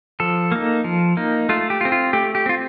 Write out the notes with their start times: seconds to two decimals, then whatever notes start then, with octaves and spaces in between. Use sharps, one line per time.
0.20 F3 A4
0.52 A#3 D#4
0.84 F3
1.17 A#3 D#4
1.49 A3 F4
1.70 G4
1.81 F4
1.85 C4
1.92 F4
2.13 A3 G4
2.35 G4
2.46 C4 F4